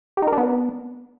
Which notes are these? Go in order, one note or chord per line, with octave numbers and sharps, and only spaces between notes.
G4
D#4
A#4
D4
B3